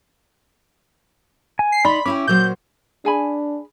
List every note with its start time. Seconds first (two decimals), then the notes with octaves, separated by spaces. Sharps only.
1.59 G#5
1.72 C7
1.85 D#4 D5 B5 C6
2.06 C#4 E4 G5 D6
2.27 A#2 F#3 C5 G6
3.05 D4 G#4 G#5 B5